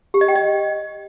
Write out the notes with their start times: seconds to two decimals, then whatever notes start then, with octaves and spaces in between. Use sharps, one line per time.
0.14 G4
0.21 D#5
0.28 G5
0.36 D#5